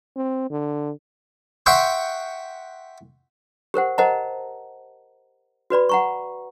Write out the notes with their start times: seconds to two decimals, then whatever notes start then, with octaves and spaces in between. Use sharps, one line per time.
0.16 C4
0.50 D3
1.66 E5 F#5 G5 C6 C#6
3.74 G4 A#4 C5 F#5
3.98 A#4 C5 D#5 F#5 A5 A#5
5.70 F#4 B4 D5 B5
5.89 F#5 A#5 C#6